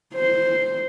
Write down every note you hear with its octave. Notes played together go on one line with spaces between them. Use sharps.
C5